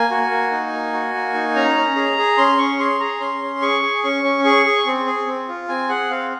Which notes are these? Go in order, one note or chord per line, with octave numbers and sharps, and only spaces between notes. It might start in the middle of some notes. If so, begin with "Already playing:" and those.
Already playing: A#3 G#5
F#4
A#3
D#4
A#3
F#4
A#3
D#4
C#4 A#5
C#4
G#4
G#4
C#4 C6
C#4 C#6
G#4 C6
G#4 A#5
C#4 C6
C#4
G#4 C#6
G#4
C#4 C#6
C#4
G#4 C#6
G#4
C4
G#4
C4
F4
C4 G#5
G#4 F#5
C4 F5